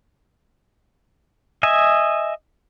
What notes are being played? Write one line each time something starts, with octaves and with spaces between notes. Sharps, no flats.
D#5 E5 G#5